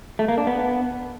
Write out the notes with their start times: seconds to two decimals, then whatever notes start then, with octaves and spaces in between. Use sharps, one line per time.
0.19 A3
0.28 A#3
0.38 D4
0.47 B3